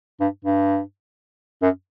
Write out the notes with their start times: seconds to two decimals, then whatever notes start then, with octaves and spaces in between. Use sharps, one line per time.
0.20 G2
0.44 G2
1.62 F#2